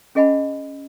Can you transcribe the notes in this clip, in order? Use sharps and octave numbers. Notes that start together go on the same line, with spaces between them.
C#4 G#4 D#5 F#5 G#5 B5